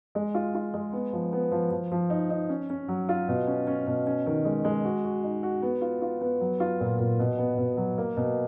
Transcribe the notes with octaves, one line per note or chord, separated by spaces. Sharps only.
G#3
F4
F4
G#3
B3
F3
B3
F3
F3
F3
D#4
D#4
C#4
C#4
F#3
F4
B2
C#4
C#4
B2
C#4
D#3
G#3
G#3
F#4
F#4
D#4
F#4
B3
F4
F4
B3
F#3
F4
A#2
A#2
B2
B3
B2
F#3
A#3
B2